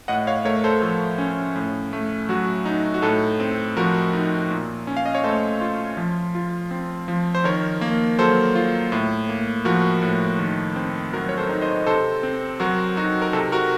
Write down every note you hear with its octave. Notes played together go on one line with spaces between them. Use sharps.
A2 D#5 F#5
C#5 F5
A3 A#4 C#5
A4 C5
F3 A4
C#4
A2
A3
F#3 F#4
D#4
F#4
A2 A4
C4
F3 F#4 A#4
D#4
A#2
C#4
F5
D#5
C#5
A3 A4 C5
F4
F3
F4
C4
F3
C5
D#3 A#4 C#5
A#3
F#3 A4 C5
F4
A2
A#3
F3 F#4 A#4
A2
D#3
C4
F#3 F#4 A#4
C#5
A4 C5
D#4
C5 D#5
C3 A4 C5
C4
F#3 F#4 A#4
D#4 F#4
A#4
C3 A4
F#4 A#4